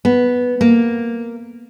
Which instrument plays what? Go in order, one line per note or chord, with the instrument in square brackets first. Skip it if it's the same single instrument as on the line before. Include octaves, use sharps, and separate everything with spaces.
[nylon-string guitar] B3
A#3